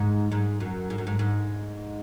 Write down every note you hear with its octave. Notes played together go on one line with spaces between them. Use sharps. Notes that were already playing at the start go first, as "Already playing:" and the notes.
Already playing: G#2
G#2
F#2
G#2
F#2
G#2
G#2